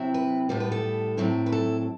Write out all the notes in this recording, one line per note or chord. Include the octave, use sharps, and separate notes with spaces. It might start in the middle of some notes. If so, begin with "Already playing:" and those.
Already playing: C3 F#3 C4 E4
B4
A2 G3 B3 C5
B4
A4
A2 F#3 C4 E4
B4
A4